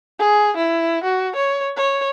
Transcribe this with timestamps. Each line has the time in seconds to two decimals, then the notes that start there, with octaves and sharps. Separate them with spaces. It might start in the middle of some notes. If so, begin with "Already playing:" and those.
0.19 G#4
0.57 E4
1.03 F#4
1.36 C#5
1.77 C#5